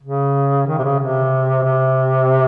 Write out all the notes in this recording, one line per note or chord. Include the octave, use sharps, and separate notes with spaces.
C#3
D#3
C3
C#3
C3
C3